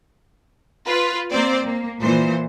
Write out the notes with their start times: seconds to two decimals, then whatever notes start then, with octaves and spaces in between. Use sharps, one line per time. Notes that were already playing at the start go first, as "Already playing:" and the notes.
0.87 F4 B4
1.31 A#3 C4 C5 D5
1.66 A#3
2.01 A#2 E3 C5